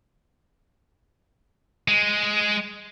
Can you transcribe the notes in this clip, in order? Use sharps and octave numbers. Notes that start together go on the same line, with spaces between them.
G#3